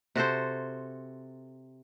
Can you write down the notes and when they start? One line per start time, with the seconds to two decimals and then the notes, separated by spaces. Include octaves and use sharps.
0.15 C3 F#4 A4 C5